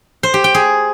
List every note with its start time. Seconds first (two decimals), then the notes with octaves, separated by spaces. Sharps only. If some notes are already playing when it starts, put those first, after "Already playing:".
0.23 C5
0.34 G4
0.44 G5
0.55 G#4